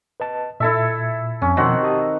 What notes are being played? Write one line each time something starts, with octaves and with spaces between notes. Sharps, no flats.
B4 D#5 A5
A#2 E4 A4 E5
F2 C#4
B2 D#3 F3 C4 F#4
G4 A5 D#6